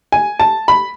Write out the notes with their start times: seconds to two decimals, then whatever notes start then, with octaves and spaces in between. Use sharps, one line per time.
0.12 G#5
0.40 A5
0.68 B5